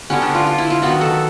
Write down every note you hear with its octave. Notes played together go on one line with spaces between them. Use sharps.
D3 G3 B3 C#4
D4
F4
F4
E4
F4
D#3 F#3 B3 F#4
A4